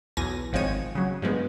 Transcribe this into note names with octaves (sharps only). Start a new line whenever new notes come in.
B1 E2 G#5 A#6
G#1 F3 G#3 C4 C#5 D#7
C#3 F#3
G2 F3 G#3 B3